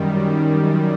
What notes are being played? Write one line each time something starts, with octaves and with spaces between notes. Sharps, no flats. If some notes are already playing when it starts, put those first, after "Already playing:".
Already playing: F#2 D#3 G3